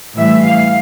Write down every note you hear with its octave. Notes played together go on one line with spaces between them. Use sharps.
A2 E3 G3 E5
F5